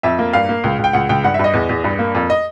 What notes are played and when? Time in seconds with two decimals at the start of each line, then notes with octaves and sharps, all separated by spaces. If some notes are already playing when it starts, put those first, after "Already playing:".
0.03 F2 E5
0.19 A#3
0.33 G2 F5
0.49 A#3
0.64 C#2
0.79 C#2
0.84 G5
0.93 C#2 F#5
1.09 C#2 G5
1.24 G2 F#5
1.34 E5
1.39 G2 D#5
1.54 E2
1.69 E2
1.84 G2
1.99 A#3
2.15 F2
2.30 D#5